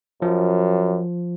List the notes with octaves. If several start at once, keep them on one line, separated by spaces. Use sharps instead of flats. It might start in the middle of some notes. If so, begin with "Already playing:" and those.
F#2 F3